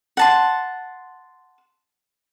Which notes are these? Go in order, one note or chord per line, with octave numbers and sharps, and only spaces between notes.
F#5 A5 C6